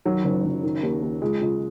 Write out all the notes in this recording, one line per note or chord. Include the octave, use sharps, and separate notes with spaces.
D#3 F#3
F#1
F#1
D#3
D#2
D#2
C#2 G#3
C#2